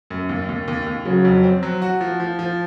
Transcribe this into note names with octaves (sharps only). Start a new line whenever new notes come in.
F#2
D#2
D#2
D#2
D#2
C#3 F#3
F2
C4
F#3
F#4
F3
F3
F3